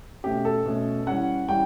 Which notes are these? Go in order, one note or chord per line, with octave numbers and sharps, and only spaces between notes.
B2 A3 C#4 G4
A4
B2 A3 C#4
E3 G3 C#4 F#5
E3 G3 C#4 G5